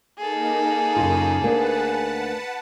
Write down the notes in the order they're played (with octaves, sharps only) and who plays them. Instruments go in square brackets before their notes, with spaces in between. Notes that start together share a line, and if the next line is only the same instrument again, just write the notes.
[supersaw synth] A#3 D#4 [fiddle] G#4 A4
[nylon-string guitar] F#2 C#3 F4
[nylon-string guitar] D2 A#3 D4 [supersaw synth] B4 F#5 A5